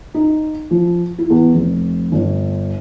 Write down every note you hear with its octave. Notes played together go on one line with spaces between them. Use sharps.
D#4
F3
E4
E2
F1
G1